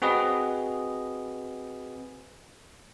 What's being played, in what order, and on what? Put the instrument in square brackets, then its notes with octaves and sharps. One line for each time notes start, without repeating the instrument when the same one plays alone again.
[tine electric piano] C4 F#4 G#4 B4 D#5